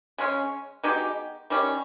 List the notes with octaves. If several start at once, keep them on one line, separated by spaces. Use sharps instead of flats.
C#3 G#3 C#4
B2 G#3 D#4 G4
D#3 G3 C#4